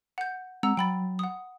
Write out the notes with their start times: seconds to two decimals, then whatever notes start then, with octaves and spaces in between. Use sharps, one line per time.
0.18 F#5 G6
0.63 G#3 C4 F#5 A#5 E6
0.77 F#3 G5 B5 A6
1.19 F#5 D#6